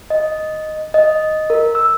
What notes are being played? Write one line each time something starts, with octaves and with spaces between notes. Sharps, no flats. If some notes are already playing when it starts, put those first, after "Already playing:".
D#5
D#5
A#4
E6